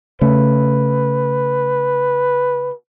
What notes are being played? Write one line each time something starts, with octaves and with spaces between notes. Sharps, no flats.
C#3 A3 B4